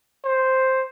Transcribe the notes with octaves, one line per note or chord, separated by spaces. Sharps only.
C5